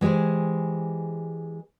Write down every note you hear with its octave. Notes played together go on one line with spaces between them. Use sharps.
E3 G#3 G4 G#4 C5